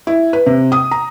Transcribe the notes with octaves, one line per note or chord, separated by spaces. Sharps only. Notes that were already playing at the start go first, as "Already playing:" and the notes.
E4
B4
C3
D#6
A#5